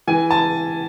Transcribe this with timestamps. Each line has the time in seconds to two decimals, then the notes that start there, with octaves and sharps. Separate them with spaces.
0.07 E3 G#5
0.31 A5